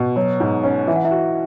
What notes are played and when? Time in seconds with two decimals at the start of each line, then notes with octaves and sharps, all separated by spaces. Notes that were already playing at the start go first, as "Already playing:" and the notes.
Already playing: B2
0.16 F#3 C#5
0.40 G#2
0.64 C#4
0.87 E3 E5
0.96 F#5
1.05 E4 E5
1.11 F#4